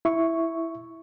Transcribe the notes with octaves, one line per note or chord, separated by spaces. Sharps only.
E4 E5 C#6